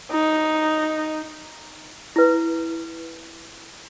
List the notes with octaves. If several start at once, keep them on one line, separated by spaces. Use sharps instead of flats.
D#4
E4 B4